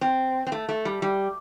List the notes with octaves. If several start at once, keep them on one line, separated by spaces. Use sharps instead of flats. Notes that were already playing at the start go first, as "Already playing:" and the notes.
C4
C4
A3
A3
G3
G3